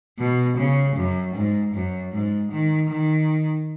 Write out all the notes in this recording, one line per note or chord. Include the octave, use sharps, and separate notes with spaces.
B2
C#3
F#2
G#2
F#2
G#2
D#3
D#3